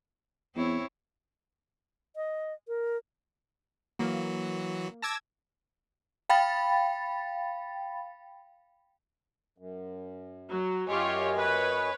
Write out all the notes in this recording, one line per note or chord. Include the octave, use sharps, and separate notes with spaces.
E2 C4 E4 C#5
D#5
A#4
E3 F#3 A#3 F#4
A5 D6 E6 G#6 A#6
F5 G5 B5 A6
F#2
F#3
F#2 F4 G4 C#5 D#5 G#5
B4 C#5